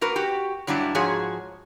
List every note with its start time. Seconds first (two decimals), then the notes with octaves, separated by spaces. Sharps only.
0.01 A#3 F#4 A#4 B4
0.16 F#4 G4
0.67 G2 F#3 G3 D4 E4
0.95 G#2 F3 F#4 G#4 C#5